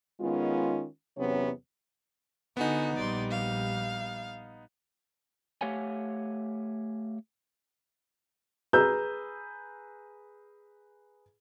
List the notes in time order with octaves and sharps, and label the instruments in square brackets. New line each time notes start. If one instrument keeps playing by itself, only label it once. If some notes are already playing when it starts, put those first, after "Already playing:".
[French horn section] D#3 G#3 B3 C#4 F4
E2 C3 F#3 B3 C#4 C#5
[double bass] D3 [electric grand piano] B3 D#4 [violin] F#4 G#5
[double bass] A#1 G3 [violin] D5 C6
[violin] F5
[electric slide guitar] A3 G4 C#5 F5 F#5 G#5
[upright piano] G#4 B4 A#5 E6 G6